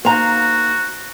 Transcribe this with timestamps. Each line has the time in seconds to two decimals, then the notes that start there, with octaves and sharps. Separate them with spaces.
0.05 A#3 D#4 F#4 C5 F5 A#5